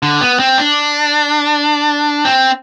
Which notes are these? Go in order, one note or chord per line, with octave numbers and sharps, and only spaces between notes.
D3
B3
C4
D4
C4